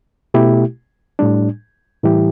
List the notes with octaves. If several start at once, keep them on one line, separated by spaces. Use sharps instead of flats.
B2 A3 E4 G4
A2 G3 D4
A2 E3 G3 E4 G4